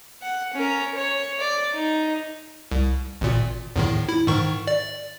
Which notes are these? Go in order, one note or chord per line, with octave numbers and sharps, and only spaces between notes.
F#5
C#4 A#4
C#5
D5
D#4
C2
G#1 A#2
E2 A2 D#3
E4
G#2 D#3 C#6
D5